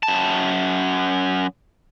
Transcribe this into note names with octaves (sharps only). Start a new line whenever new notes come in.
F#2 A5